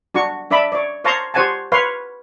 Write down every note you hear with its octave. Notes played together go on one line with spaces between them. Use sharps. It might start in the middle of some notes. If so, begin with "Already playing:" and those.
D4 F#4 C#6
D4 D5 E5 B5
C#5 D5
C5 C#5 F5 A5 A#5 C6
G4 C5 C#5 F#5 G#5 A5
B4 C#5 F5 C6